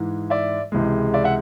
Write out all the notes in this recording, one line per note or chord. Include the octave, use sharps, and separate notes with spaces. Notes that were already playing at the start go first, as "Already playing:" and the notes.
Already playing: G#2 E3 G#3
D5 E5
C#2 C3 E3 G#3
D5 E5
E5 F#5